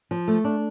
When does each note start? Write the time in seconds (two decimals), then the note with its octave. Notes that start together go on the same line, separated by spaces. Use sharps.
0.11 F3
0.28 A3
0.44 D4